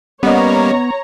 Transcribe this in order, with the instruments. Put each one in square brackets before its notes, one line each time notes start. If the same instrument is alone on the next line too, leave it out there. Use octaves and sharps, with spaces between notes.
[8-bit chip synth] G3 A#3 [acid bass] B3 [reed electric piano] C#4 D#5 [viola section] C#5 A#5